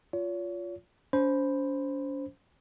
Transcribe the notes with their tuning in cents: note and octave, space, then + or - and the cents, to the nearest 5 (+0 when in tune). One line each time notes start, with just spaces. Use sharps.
F4 +0 C#5 +40
C#4 +45 C5 +0 B5 +0